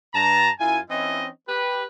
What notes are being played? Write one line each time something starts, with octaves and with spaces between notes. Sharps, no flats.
G2 A5 A#5
F#2 E4 F4 G#5
E3 C4 C#4 D#4 E4 D#5
G4 B4